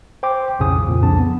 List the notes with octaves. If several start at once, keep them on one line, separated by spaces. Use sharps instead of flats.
C5 G5 C6 D6
B1 F2 A2 C#3 G#5 D#6
F2 A#2
C2 F2 D4 G#4 A5
B3